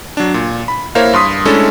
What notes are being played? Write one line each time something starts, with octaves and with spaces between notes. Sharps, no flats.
F#3 D4
A#2
B5
A#3 E4 A#4 C5 C#5 F5
G2 C6 D#6 B6
G#3 A3 C#4 D4 E4 A4